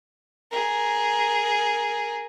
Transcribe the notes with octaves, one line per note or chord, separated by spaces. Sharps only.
G#4 A#4